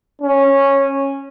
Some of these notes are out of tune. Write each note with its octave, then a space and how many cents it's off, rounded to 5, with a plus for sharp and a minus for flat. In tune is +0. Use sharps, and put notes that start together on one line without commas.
C#4 -10